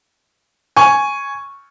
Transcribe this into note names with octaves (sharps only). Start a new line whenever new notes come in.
G#5 C#6